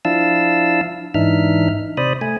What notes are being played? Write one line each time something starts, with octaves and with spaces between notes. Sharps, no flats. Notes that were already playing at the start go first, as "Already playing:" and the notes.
F3 D4 E4 F5 A5 E6
G#2 E3 D4 D#4 E5 F6
C3 C5 D5 B5 D#6
A3 G#5